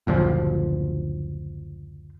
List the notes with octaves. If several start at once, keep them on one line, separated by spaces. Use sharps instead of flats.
F#1 D2 A#2 F3